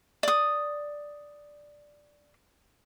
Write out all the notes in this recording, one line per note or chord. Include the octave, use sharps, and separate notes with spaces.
D5 D#6